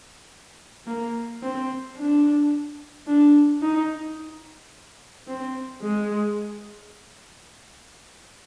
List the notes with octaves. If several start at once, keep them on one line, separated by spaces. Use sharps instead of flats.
A#3
C4
D4
D4
D#4
C4
G#3